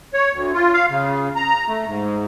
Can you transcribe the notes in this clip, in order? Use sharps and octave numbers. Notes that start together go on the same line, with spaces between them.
C#5
D2
F4
F5
C#3
A#5
A3
G#2